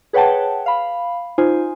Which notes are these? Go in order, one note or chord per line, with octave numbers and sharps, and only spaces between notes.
G#4 B4 C#5 F#5 G5 A5
F5 B5
D#4 F4 C5 G#5